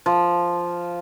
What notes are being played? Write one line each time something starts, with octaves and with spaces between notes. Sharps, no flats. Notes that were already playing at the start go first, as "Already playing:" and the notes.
F3